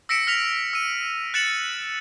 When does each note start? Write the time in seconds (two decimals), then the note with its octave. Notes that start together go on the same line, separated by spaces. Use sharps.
0.09 E6 A#6 B6 C#7 D7 E7
0.27 F6 A#6 B6 F7
0.73 E6 D#7
1.34 F#6 A6 C#7 E7 F#7